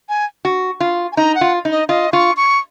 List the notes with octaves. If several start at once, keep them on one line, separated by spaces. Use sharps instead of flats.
G#5
F#4
F4
G#5
D#4 A#5
F#5
F4
D#4
D#5
F4 D#5
F4 C#6
C#6